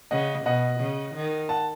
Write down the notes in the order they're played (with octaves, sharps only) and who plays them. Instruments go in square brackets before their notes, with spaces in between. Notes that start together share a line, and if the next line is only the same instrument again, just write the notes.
[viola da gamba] C#3 [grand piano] D#5 F#5
[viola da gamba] B2 [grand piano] D#5 F#5
[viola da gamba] C#3
D#3
[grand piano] F#5 A5